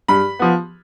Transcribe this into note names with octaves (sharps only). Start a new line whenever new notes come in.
G2 B5
F3 B3